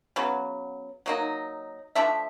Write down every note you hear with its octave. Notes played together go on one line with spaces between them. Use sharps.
C#3 F#3 B3
F#3 A#3 D#4 D#5
F3 A3 D4 E5